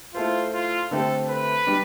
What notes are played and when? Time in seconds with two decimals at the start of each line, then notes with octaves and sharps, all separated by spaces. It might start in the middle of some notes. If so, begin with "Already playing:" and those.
0.15 A3 E4 F4 A4 C5
0.53 F4
0.91 D3 A3 C4 G4 A4 C5
1.29 B4
1.67 G3 D4